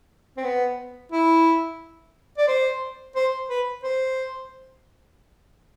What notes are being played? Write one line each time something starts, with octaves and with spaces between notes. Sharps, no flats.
C4
B3
E4
D5
C5
C5
B4
C5